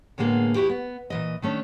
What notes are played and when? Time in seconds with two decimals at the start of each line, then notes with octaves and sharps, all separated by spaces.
0.18 A2 D3 G#3 A#3 B3 G#4
0.55 E2 E4 F#4 G4
0.69 B3
1.10 A#2 E3 D#5
1.42 D#3 A3 C#4 D4